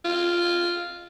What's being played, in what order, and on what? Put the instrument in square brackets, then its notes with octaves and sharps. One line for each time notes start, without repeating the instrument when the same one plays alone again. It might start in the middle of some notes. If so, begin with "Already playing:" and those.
[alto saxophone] F4